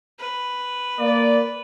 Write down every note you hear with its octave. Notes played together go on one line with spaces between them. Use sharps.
B4
A#3 D5